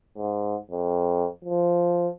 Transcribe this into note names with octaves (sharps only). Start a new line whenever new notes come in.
G#2
F2
F3